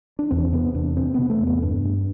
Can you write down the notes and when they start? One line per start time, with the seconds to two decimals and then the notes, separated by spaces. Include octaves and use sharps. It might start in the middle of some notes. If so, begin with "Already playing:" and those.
0.19 D4
0.31 E2 C4
0.53 C3 B3
0.74 E2 D4
0.97 C3 C4
1.14 C3 B3
1.30 A3
1.41 E2
1.47 B3
1.62 G2 D4
1.85 G2